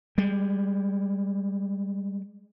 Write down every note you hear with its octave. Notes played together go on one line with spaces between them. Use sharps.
G3 G#3